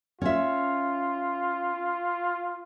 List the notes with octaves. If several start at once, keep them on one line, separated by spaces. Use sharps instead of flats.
C#4 F4 E5